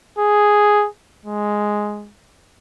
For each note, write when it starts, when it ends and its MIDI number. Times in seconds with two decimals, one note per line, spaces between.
0.19 0.87 68
1.26 2.10 56